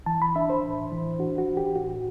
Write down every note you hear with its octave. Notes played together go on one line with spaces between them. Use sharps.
E3 A5
B5
D4 E5
C5
A2
E3
D4 F#4
F#4
E3
G4
A2 F#4